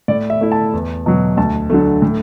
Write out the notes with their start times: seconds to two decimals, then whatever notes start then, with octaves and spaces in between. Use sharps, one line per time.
0.08 A2 D5
0.30 E5
0.41 A3 E4
0.52 A5
0.73 E2
1.06 B2 F#3
1.37 D2 A5
1.70 D3 F#3 A3
2.02 A2